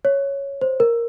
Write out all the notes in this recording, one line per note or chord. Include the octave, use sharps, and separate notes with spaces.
C#5
C5
A#4